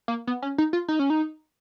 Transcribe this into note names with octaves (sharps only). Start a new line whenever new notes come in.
A#3
B3
C#4
D#4
F4
D#4
C#4
D#4